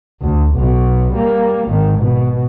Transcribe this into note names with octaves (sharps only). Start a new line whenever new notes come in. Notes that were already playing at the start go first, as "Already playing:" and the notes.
D2
B1 B2
G3 A#3
G#1 D#3
B2